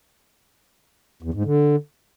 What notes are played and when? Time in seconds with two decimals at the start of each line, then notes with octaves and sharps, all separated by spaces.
1.23 E2
1.34 G#2
1.45 D3